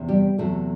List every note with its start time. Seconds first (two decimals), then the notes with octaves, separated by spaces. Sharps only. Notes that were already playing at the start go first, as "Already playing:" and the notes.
Already playing: E2 C3
0.08 G3 G4
0.38 E2 C3 F#3 A3 A4